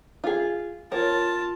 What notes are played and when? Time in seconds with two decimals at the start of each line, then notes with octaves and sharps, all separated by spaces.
0.24 F4 G#4
0.92 F4 A#4 C#5 A5